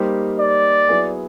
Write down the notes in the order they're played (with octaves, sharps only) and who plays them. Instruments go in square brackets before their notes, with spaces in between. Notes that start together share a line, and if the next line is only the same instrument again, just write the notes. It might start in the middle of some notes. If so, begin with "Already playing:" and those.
Already playing: [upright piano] G3 A#3 D#4 G4 C5
[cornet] D5
[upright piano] F#3 B3 E4 G#4